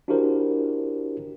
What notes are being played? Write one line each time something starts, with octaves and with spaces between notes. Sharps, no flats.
D4 E4 F#4 G4 A#4 C5